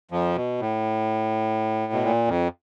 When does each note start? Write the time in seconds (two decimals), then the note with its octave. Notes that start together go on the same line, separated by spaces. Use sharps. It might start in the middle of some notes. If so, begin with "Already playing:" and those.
0.11 F2 F3
0.36 B2
0.60 A2
1.93 B2
2.04 A#2
2.28 F2